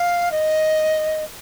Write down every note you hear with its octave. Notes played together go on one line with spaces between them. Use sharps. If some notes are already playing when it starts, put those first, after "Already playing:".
Already playing: F5
D#5